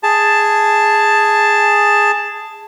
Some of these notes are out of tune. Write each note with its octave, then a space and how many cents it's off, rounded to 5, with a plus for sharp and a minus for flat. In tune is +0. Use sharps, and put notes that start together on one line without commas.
G#4 -5 A5 +0